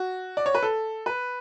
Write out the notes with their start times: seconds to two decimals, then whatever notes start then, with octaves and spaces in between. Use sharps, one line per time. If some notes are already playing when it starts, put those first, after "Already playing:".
Already playing: F#4
0.37 D5
0.46 C#5
0.55 B4
0.63 A4
1.06 B4